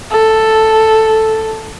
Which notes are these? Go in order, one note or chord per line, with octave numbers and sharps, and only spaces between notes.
A4